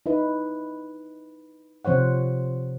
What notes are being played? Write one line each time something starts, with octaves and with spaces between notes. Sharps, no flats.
D#4 E4 B4
C3 F3 C5 C#5 F#5